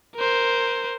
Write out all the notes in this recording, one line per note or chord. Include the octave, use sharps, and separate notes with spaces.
A#4 C5